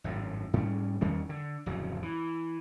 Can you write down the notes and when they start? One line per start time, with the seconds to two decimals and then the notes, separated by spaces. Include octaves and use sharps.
0.04 G#1 F#2 A2
0.53 G#2 G3 C#4
1.01 E2 D#3 G3 C#4
1.29 D3
1.66 D1 F2 C#3 F#3
2.02 E3